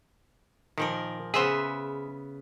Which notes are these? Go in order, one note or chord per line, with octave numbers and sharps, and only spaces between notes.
A#2 D#3 F3 A#4
C#3 B3 G#4 C5 E5